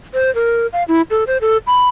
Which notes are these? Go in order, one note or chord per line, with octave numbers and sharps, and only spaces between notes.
C5
A#4
F5
E4
A4
C5
A4
B5